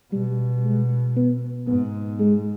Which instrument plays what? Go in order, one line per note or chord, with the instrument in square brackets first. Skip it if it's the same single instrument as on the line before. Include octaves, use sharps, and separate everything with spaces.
[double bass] B2 [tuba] G3
[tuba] G#3
B3
[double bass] G#2 [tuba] B3
[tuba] G#3